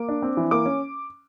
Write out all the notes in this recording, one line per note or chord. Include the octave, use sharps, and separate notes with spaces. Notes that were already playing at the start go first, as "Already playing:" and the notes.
Already playing: A#3 D6
D4
C4
E3
A#3 D6
C#4